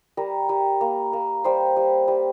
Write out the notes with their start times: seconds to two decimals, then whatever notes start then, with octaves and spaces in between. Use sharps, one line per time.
0.17 G3 A#4
0.49 G3
0.81 A#3
1.13 A#3
1.44 G3 C5
1.76 G3
2.08 G3